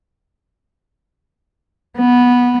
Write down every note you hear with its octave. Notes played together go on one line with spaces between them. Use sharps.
B3